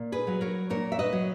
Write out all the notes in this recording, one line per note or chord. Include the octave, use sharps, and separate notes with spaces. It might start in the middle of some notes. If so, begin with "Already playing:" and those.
Already playing: A#2
G#4 B4
F#3
A#4 C#5
A#2 A#4 C#5
E5
B4 D#5
F#3